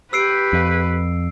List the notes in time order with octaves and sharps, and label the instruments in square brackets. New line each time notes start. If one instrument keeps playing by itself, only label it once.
[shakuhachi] G4 [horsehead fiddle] B4 [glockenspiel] E6 C7 D7
[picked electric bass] F2